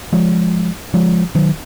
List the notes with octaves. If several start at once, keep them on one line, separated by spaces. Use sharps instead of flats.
F3 G#3
F3 G#3
D#3 F#3